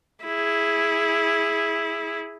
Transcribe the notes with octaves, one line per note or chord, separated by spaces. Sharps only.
E4 G#4